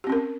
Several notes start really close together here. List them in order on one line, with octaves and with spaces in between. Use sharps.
G4 C4 C#4 A#4